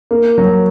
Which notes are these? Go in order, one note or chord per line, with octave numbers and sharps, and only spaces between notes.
A#3
F#3